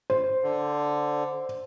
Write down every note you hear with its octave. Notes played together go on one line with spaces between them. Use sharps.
C5
D3